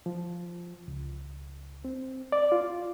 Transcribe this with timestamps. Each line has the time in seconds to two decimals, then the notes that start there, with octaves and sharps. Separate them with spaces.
0.06 F3
0.88 C#2
1.85 C4
2.32 D5
2.52 F4